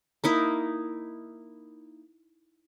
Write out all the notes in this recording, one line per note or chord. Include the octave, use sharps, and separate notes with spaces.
A#3 D#4 E4